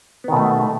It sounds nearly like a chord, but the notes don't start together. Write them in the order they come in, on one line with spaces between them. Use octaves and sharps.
B3 D#3 B2 A3